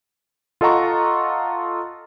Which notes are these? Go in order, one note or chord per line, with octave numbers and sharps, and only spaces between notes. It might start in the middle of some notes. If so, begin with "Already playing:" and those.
F4 A4 D#5 F#5 A#5 C#6